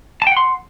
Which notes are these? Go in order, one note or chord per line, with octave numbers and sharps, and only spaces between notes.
F#5 G5 A5 C6